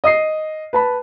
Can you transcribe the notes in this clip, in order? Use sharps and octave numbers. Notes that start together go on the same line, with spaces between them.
D#5 D#6 C7
B4 A5 B5